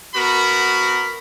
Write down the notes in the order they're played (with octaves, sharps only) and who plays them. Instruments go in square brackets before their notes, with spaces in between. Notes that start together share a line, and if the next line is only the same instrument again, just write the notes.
[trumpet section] B3 F#4 A#4 B5